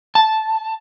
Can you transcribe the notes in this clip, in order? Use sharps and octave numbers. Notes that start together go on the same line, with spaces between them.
A5